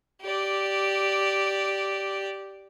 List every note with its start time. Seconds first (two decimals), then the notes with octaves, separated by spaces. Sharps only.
0.22 G4 D5